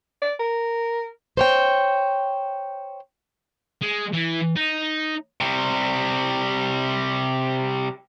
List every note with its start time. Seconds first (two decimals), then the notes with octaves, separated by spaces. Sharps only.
0.22 D5
0.40 A#4
1.37 C5 C#5 G5
3.82 G#3
4.13 E3
4.56 D#4
5.41 C3 G3